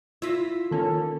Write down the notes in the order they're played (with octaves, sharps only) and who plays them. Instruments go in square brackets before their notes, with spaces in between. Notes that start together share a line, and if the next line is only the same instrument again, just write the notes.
[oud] E4 F4 [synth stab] E6 A#6 B6
[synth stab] D#3 A#3 C#4 [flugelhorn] A4